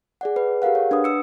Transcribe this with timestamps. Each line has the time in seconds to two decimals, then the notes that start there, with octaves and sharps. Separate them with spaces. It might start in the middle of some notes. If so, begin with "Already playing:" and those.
0.21 G#4 D5 F#5
0.36 B4
0.62 G4 G#4 A#4 F5 F#5
0.75 C#5
0.91 D4 B4 F#5 D#6
1.04 D#6 E6 C#7